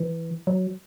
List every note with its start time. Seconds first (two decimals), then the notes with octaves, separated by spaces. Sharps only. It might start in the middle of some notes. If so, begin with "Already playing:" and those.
Already playing: E3
0.47 F#3